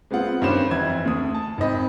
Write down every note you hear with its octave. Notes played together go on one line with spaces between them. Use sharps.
G#3 B3 C4 F4 F#5
G2 D#3 C#4 C5 E7
F2 E3 G#6
D2 D#6
A5
G#1 C4 D#5 B5